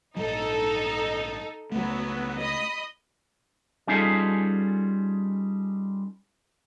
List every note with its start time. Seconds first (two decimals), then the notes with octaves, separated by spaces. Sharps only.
0.16 A#1 G#2 F#3 D#4 A4
1.72 C#2 F#3 A3 B3
2.39 D#5 B5 D#6
3.87 G3 C#4 D#4 F4 G#4 A4